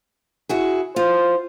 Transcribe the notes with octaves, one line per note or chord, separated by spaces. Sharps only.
E4 F#4 G#4
F4 C5